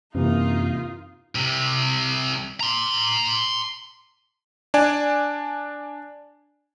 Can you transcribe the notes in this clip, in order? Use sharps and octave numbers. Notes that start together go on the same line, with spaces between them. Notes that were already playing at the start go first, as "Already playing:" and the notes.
F#2 C3 E3 A#3 D#4 F4
C2 C3
A#5 C6
D4 D5 G#5